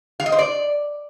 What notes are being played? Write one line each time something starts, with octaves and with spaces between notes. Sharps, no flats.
F5
D#5
C5
D5